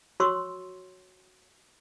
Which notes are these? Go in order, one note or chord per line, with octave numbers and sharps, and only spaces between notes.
F#4 C#5 C6 C#6 E6